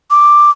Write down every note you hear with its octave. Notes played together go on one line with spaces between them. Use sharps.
D6